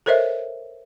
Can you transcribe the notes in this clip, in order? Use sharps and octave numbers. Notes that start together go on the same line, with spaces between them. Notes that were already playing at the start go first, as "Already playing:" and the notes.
A4 A#4 C5 C#5 D#5 E5